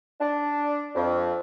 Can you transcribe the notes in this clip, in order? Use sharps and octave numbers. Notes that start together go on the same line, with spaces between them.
D4
F2